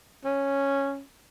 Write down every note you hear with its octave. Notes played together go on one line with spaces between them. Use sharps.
C#4